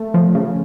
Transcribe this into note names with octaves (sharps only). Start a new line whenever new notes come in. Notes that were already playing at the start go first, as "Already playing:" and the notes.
Already playing: A3
F3
C#3